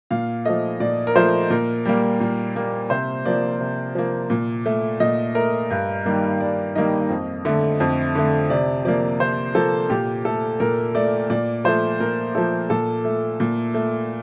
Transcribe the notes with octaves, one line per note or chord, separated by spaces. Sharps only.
A#2 F5
F3 A3 D#5
A#2 D5
A#4
F3 A3 C5
A#2 A#4
G3 A#3
A#2
G3 A#3
C3 C5
F3 A#3 D5
C3
F3 A#3
A#2
A3
A#2 D#5
A3 A#4
G2
D#3 G3 A#3
G2 D5
D#3 G3 A#3 D#5
F2
D3 A3
F2
D3 A3
C3 D5
F3 A#3 D5
C3 C5
F3 A#3 A4
A#2 G4
A3 A4
A#2 A#4
A3 D5
A#2 D5
F3 A3 C5
A#2 A#4
F3 A3 A4
A#2 A4
A3
A#2
A3